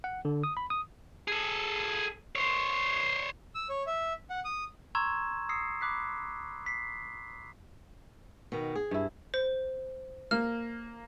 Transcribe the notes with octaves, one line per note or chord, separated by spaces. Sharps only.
F#5
D3
D#6
B5
D#6
G#4 A4
C5 C#5
E6
C#5
E5
F#5
D#6
A#5 C6 C#6 E6 G#6 E7
D#6 E6 A#6 C7 C#7
B5 D6 F#6 B6 C7
B6 C7
B2 D#3
G#4
G2 E4
C5
A#3 F6